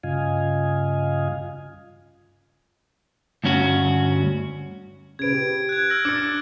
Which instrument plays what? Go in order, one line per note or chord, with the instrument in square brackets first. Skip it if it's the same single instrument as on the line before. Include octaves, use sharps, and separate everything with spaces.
[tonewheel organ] G2 C#3 F4 D#5 F5 G#5
[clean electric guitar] D2 G2 C#4 F#4
[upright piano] C#3 B4 [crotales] G#6 D7
[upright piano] G4
[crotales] F#6 G#6
E6 F6 A#6
[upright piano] D4 A6 [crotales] D6 F6 C#7